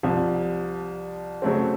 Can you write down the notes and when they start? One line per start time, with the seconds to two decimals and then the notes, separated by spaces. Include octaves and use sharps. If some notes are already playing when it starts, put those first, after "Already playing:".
0.03 C2 C3 F3
1.42 C#3 F#3 A3 C4